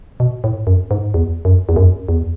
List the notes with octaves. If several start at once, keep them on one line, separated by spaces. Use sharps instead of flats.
B2
A2
F#2
G#2
E2
F#2
E2
F#2
E2